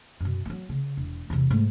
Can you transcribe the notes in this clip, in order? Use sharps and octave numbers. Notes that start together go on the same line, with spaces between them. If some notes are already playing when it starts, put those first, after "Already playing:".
F#2 B2
F#3 B3
C#3
E1
E2 C3
G#2 A3